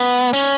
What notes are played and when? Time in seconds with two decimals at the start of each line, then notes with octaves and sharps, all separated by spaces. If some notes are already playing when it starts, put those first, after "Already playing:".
Already playing: B3
0.33 C#4